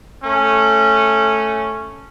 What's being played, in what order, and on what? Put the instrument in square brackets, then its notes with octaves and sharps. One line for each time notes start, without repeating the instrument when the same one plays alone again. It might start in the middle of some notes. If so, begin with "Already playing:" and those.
[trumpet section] A3 C#4